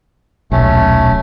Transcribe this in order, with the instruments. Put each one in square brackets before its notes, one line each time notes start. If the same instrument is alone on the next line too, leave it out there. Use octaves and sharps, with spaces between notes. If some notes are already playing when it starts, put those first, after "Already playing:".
[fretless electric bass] D#1 B1 [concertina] A3 C#4